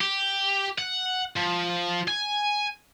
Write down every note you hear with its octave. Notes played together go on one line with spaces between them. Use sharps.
G4
F#5
F3
G#5